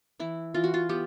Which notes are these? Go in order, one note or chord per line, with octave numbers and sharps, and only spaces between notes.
E3 E4
E3 F4
F#4
F4
B3 G4